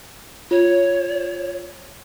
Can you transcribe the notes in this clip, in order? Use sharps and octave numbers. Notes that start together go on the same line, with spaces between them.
F4 C#5